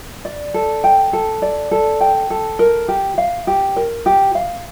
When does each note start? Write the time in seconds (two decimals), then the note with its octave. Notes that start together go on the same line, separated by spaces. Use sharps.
0.25 D5
0.54 A4
0.84 G5
1.13 A4
1.42 D5
1.71 A4
2.01 G5
2.30 A4
2.59 A#4
2.88 G4
3.18 F5
3.47 G4
3.76 A#4
4.06 G4
4.35 F5